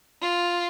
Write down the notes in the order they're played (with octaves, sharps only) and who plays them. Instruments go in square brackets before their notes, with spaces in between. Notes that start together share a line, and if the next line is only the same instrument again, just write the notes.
[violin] F4